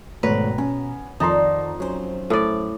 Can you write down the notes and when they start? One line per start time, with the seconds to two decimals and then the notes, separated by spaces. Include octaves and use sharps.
0.23 G#1 B2 A3 C4 B4 C#5 A#5
0.58 B3 C#4
1.20 F2 D#3 D#4 F#4 D5 A5 A#5 C6
1.80 F#3 A3 C#4 C5
2.30 A2 D5